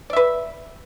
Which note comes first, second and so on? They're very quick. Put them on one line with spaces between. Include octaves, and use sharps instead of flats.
D5 E5 B4